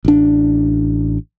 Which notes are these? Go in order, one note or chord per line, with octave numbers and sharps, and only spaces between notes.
A1 D4